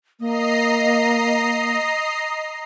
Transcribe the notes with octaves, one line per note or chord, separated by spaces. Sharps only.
A#3 D#5 A#5 C7